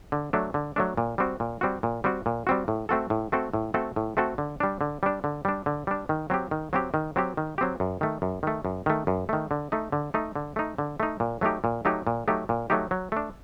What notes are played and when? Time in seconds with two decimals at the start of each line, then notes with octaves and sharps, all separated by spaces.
0.12 D3
0.33 F#3 A3 D4
0.54 D3
0.76 F#3 A3 D4
0.97 A#2
1.18 G3 C4 F#4
1.40 A#2
1.61 G3 C4 F#4
1.83 A#2
2.04 G3 C4 F#4
2.26 A#2
2.47 G3 C4 F#4
2.68 A2
2.89 A3 C4 F#4 A4
3.10 A2
3.32 A3 C4 F#4 A4
3.54 A2
3.74 A3 C4 F#4 A4
3.96 A2
4.17 A3 C4 F#4 A4
4.38 D3
4.60 G3 D4
4.81 D3
5.03 G3 D4
5.24 D3
5.45 G3 D4
5.66 D3
5.87 G3 D4
6.09 D#3
6.30 F#3 C4 G4
6.51 D#3
6.73 F#3 C4 G4
6.94 D#3
7.16 F#3 C4 G4
7.37 D#3
7.58 F#3 C4 G4
7.80 F#2
8.01 D#3 A3
8.22 F#2
8.43 D#3 A3
8.65 F#2
8.86 D#3 A3
9.07 F#2
9.29 D#3 A3
9.51 D3
9.72 A3 D#4
9.92 D3
10.14 A3 D#4
10.36 D3
10.56 A3 D#4
10.78 D3
11.00 A3 D#4
11.20 A#2
11.41 F#3 A3 D#4 G4
11.64 A#2
11.85 F#3 A3 D#4 G4
12.07 A#2
12.28 F#3 A3 D#4 G4
12.49 A#2
12.70 F#3 A3 D#4 G4
12.91 F#3
13.12 A3 D4